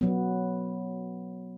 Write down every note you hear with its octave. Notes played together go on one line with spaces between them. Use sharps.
F#3 B3